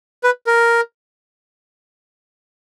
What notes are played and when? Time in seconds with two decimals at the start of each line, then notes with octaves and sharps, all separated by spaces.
0.24 B4
0.47 A#4